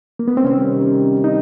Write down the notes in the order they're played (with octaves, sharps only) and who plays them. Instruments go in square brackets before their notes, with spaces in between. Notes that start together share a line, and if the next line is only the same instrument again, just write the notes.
[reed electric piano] A#3
B3
C4
[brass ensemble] C3 D#3 G3 [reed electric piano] C#4
[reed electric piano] D#4